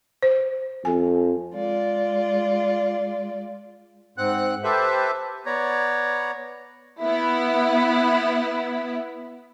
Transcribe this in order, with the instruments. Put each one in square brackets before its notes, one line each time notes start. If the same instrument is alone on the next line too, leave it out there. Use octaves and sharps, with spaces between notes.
[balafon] C5
[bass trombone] F2 [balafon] G#5
[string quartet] G#3 F4 D5
[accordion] G#2 C4 F#5 F#6
G4 A4 B4 C5 E5
[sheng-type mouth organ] B3 C#5 D5 A#5
[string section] B3 E4